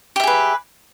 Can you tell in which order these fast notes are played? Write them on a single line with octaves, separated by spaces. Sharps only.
G4 E5 G#4 B4